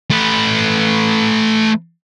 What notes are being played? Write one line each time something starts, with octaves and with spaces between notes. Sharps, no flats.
A3 B4